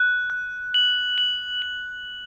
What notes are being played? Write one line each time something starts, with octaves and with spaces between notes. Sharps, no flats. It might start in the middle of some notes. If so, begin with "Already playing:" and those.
Already playing: F#6
F#6
F#7
F#7
F#7